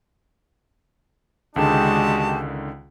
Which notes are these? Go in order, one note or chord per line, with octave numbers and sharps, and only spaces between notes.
C#2 D3 D#3 G#3 D4 F#4 G4 A5